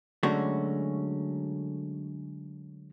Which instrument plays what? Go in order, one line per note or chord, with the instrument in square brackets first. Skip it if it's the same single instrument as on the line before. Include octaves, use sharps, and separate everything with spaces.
[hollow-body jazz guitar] D3 F#3 G#3 A3 C#4 F#4